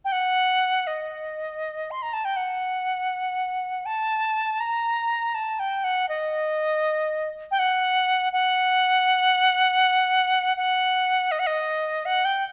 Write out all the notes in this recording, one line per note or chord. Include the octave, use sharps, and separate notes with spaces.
G5
F#5
D#5
C6
A#5
A5
G5
F#5
A5
A#5
A5
G5
F#5
D#5
G5
F#5
F#5
F#5
D#5
F#5
D#5
F#5
G5